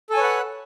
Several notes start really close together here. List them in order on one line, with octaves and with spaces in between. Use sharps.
A4 G#5 C#5 B4 F#5